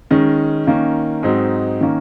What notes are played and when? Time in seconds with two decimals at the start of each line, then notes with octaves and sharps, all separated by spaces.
0.11 D#3 G#3 C#4
0.67 D#3 A#3 C#4
1.23 G#2 F#3 C4 D#4
1.81 D#3 A#3 C#4